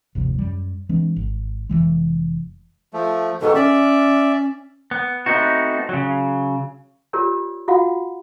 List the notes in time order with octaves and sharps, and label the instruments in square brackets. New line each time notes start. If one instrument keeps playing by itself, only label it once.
[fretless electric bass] G1 D#2 C3 F3
F#2 G3
E3 G#3 C4 D4
G#1
F1 C#2 E3 G#3
[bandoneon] F3 A3
[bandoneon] G#2 B2 D#3 [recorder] A4
[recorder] C#4 [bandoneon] D5 E5
[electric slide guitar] B3
A3 B3 C4 D#4 F#4
C#3 F#3
[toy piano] F4 G4 A#4 C#5 D5
F4 F#4 F5 F#5